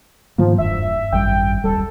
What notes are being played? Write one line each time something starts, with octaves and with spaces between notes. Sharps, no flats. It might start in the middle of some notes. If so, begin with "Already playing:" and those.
G#2 D#3 F3 A#3
E1 G2 E5
G#1 F#2 G3 G5
D#1 G3 A4